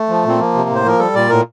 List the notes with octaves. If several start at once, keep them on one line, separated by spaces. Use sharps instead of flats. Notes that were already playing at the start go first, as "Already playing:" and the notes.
Already playing: A3
F3
A#2 C4
F3 A#3
C3
A2 C5
F3 A#4
G3 A4
A#2 D5
A2 A#4